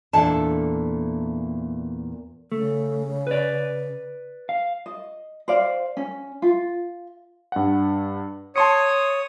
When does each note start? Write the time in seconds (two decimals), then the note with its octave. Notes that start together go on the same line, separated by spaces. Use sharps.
0.13 E2 A#2 D4 A4 A5
2.52 C#3 A3
3.27 B4 D5
4.49 F5
4.86 D#5
5.48 C5 D5 F5
5.97 C#4
6.42 F4
7.52 G2 F#5
8.56 C#5 A5 C6 D#6 C#7